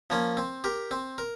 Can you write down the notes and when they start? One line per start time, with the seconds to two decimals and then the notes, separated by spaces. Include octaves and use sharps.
0.10 F3 A#3 C#4
0.37 C4
0.64 G4 A#4
0.91 C4
1.18 A#4